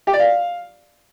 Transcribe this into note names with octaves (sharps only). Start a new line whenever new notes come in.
G4
D5
F5